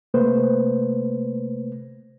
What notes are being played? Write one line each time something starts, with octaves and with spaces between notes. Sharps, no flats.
C3 A3 A#3 B4 C5